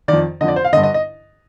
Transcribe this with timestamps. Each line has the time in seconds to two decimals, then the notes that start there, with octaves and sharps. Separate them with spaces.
0.08 D#3 D5
0.13 F2
0.41 D3 D#5
0.44 F2 D5
0.56 C5
0.64 F5
0.73 D3 D#5
0.77 G2
0.83 D#5
0.94 D#5